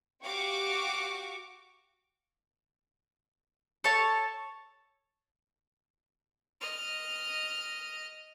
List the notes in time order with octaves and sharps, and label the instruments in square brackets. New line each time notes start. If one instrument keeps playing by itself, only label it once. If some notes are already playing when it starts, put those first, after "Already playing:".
[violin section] F#4 G4 F5 G5 C#6 D6
[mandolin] A4 C#5 A5
[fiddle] D#5 F6